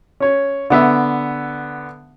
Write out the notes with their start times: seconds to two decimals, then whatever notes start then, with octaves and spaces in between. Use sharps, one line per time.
0.20 C#4 C#5
0.70 D3 B3 E5